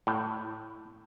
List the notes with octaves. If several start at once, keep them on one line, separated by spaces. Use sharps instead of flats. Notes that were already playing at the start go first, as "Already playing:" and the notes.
A2